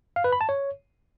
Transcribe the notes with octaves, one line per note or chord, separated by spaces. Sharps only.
F5
B4
B5
A5
C#5